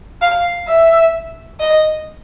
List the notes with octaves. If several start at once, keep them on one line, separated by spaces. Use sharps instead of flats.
F5
E5
D#5